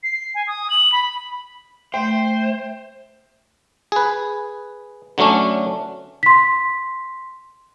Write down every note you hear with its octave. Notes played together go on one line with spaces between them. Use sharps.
C7
G#5
D#6
F#7
B5
A3 C5 G5
G#4 B4
D3 F#3 A3 C#4 D4
C6 B6